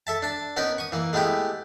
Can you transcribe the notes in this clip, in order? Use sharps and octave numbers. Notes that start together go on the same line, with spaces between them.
A4 E5 A5
D4 A5
B3 C#4 D#4 A#4 B4
C#6 D#6
E3 A#3
G#3 A3 B3 E4 G4